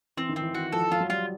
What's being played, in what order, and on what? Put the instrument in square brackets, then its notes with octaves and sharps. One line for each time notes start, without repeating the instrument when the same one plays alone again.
[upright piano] E3 [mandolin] C4
[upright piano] D#3
[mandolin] C4
[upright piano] E3
[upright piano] E3 [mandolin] F#4
[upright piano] F3 [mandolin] A4
[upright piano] F3 [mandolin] F4
[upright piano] F#3
[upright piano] G3 [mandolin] F4